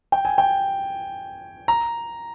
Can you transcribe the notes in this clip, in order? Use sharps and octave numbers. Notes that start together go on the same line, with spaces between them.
G5
G#5
G5
A#5